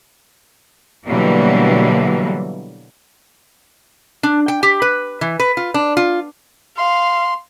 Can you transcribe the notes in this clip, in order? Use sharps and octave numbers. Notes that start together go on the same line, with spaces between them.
B2 D3 E3 F#3 G3 A#3
D4
G5
G4
B4
E3
B4
F4
D4
F4
F5 C6